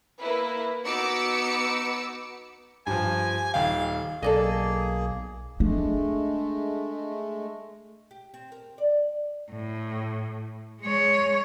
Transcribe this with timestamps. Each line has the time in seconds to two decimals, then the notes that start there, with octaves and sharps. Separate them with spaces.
0.20 A#3 E4 B4
0.85 B3 D#4 F#4 D6 E6 C#7
2.87 G2 F3 G#5
3.54 D#1 F5 G5
4.22 B1 A#3 G#4 A4 D5 D#5
5.60 G#3 A3 D4
8.11 G4
8.34 C4
8.52 A#4
8.78 D5
9.52 A2
10.82 G#3 C#5